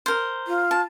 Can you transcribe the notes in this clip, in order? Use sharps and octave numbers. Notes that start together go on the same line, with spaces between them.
A#4 C5
F4
A5